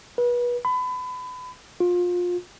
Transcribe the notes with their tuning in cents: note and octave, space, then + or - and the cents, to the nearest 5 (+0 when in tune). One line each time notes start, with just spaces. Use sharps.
B4 -30
B5 +30
F4 +25